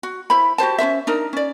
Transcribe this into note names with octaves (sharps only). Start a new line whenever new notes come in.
F#4
E4 C5 B5
F#4 G4 C5 A5
C#4 F4 C5 E5
D4 D#4 A#4
C#4 D5